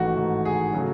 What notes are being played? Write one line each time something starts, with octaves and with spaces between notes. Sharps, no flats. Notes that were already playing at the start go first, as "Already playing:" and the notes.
Already playing: A1 G#2 D#3 A3 F#4
A1 G#2 D#3 A3
G#4
C#3 F#3 A3